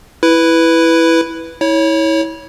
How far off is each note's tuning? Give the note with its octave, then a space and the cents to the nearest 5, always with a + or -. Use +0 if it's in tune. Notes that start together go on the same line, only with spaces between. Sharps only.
E4 +0 B4 +0
E4 -30 C#5 +0